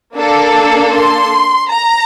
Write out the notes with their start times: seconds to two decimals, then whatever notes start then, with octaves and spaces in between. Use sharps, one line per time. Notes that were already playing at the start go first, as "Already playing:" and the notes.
0.17 A#3 D4 A4
0.94 C6
1.71 A#5